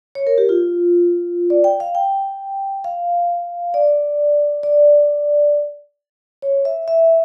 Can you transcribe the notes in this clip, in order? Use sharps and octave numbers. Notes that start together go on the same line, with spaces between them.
C#5
A#4
G4
F4
D5
G5
F5
G5
F5
D5
D5
C#5
E5
E5